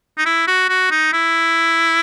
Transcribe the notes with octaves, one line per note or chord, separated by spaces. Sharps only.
D#4
E4
F#4
F#4
D#4
E4